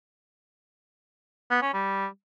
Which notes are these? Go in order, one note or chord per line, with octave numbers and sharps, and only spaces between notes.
B3
C#4
G3